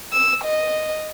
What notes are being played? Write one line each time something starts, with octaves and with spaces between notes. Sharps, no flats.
E6
D#5